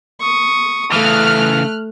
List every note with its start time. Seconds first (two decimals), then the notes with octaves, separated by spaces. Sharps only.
0.21 C#6 D#6
0.92 C#3 E3 A3 F6 F#6